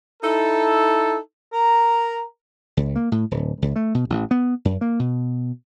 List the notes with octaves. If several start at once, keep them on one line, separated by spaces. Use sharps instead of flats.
D#4 E4 A4
A#4 A#5
C#2
A#3
A2
D1
C#2
A3
B2
A1
B3
F#2
A#3
B2